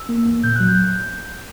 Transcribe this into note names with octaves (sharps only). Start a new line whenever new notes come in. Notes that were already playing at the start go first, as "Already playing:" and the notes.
Already playing: E6
A#3
E2
A#2 G6
F#3 F#6
G6